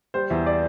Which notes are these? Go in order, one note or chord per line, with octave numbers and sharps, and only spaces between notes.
G3 C5
E2 E5
D5